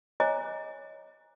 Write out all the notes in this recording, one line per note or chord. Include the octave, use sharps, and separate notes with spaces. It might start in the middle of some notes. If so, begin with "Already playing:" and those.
C5 C#5 D#5 G#5 A#5 D6